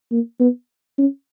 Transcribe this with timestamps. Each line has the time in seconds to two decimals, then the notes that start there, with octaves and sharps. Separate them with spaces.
0.12 A#3
0.40 B3
0.98 C#4